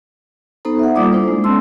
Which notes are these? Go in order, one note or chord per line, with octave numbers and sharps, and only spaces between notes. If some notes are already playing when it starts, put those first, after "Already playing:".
B3 D#4 A4 C5 A#5
E5 F#5
G3 A#3 F4 D5 D6 D#6
D4 E4 A4 C5
G#3
B3 C#4 A5 C6 E6